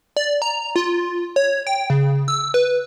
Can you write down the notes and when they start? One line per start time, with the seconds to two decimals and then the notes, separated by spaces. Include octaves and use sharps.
0.17 D5
0.42 A#5
0.76 F4
1.36 C#5
1.67 G5
1.90 C#3
2.28 E6
2.54 B4